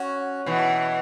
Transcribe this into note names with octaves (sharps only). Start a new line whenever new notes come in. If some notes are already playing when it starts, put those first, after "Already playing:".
Already playing: C#4 F#4
B2 E3